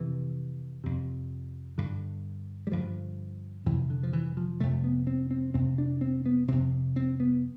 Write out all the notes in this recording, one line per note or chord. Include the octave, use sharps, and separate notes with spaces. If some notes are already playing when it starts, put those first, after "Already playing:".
Already playing: F2 C3 E3
F2 C3
G2 D3
G3
G2 D3 F3
F2 C3 E3
D3
F3
E3
F3
F2 C3 A3
B3
C4
C4
F2 C3 C4
D4
C4
B3
F2 C3 C4
C4
B3